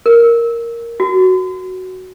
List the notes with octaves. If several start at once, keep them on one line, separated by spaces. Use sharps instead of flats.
A#4
F#4